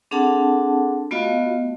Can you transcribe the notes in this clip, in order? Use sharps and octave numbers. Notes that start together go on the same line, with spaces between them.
C4 D4 G#4 A4 F#5 A5
A3 B3 F4 F#4 D#5 F5